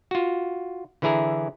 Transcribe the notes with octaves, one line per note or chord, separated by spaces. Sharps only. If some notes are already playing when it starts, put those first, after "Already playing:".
F4 F#4
D3 E3 E4 G#4 A#5